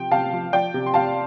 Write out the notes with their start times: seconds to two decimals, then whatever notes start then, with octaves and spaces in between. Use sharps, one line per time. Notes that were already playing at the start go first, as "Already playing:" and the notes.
Already playing: C3 F3 G5
0.11 C3 F5 A5
0.33 F3
0.53 F3 D5 G5
0.74 C3
0.86 C6
0.94 C3 F5 A5